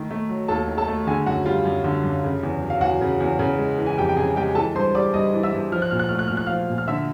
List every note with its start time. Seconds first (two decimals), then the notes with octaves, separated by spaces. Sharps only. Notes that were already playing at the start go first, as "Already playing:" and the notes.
Already playing: D#3 A3
0.11 A3
0.29 F#3
0.48 D#2 A4 A5
0.68 D#3
0.78 A4 A5
0.88 A3
1.07 D3 G#4 G#5
1.26 F#2 F#4 F#5
1.45 G3 F4 F5
1.65 F#2
1.84 D3
2.04 F#2
2.24 C#3
2.43 E2
2.62 F#3
2.70 F5
2.81 E2 F#4 F#5
3.01 C#3
3.20 E2
3.39 C#3
3.58 G#3
3.78 E3
3.86 G#5
3.98 F2 G4 G5
4.09 G5
4.16 C#3 G#4 G#5
4.36 G#3 G4 G5
4.55 E3 A4 A5
4.75 G2 C5 C6
4.95 G3 D5 D6
5.14 G2 D#5 D#6
5.33 E3
5.43 E5 E6
5.53 G2
5.72 F3 F6
5.82 F#6
5.91 A#2 F6
5.99 F#6
6.09 A3 F6
6.19 F#6
6.28 A#2 F6
6.37 F#6
6.47 F3 F5 F6
6.70 A#2
6.78 F6
6.88 D3 E5 E6